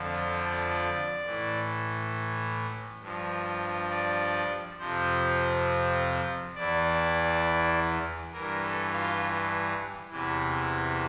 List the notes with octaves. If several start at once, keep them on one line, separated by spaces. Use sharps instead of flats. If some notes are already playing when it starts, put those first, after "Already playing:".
Already playing: F2 D3 F3
D5
A2 E3
G2 F3
D5
F2 C3 F3 C5
E2 E3 D5
G2 E3 A#4
A4
F4
E2 C3 E3